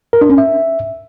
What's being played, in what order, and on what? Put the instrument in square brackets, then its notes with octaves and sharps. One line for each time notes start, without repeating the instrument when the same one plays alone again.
[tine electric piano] A#4
D4
C#4
E5